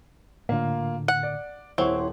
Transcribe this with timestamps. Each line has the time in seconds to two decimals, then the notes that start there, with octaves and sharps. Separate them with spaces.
0.49 A2 D3 A#3 F4
1.08 F#5
1.23 D5
1.78 D#1 C4 E4 C#5 F#5 C6 C#6